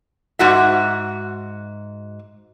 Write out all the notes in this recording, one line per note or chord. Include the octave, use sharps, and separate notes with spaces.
G#2 F#4 E5